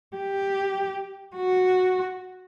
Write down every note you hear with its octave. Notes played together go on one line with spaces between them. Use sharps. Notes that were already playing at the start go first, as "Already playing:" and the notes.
G4
F#4